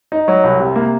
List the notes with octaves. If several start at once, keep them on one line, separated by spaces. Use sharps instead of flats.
D#4
F#3
C2
C3
A#3